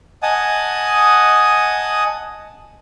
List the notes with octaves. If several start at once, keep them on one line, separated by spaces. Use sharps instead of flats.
D#5 F#5 G#5 A5 D#6